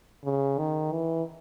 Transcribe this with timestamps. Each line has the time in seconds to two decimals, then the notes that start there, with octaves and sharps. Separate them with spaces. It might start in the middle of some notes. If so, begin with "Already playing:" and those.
0.24 C#3
0.58 D#3
0.92 E3